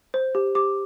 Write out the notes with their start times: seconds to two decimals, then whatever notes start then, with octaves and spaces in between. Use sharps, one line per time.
0.14 C5
0.35 G4
0.55 G4 D6